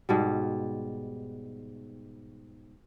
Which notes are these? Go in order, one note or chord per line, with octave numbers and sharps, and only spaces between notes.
G#2 B2 G3